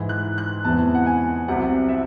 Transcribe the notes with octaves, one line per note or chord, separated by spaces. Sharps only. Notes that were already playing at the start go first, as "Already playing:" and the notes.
Already playing: G#2 E3
F#6
F#6
E2 C3 E3 A5
F#5
G#5
C2 C3 F#3 F#5
E5